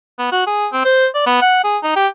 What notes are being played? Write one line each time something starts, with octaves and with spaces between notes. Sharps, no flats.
B3
F#4
G#4
C4
C5
D5
B3
F#5
G#4
D#4
G4